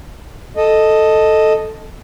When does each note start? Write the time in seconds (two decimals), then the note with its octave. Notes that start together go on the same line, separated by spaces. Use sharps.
0.57 A4 D#5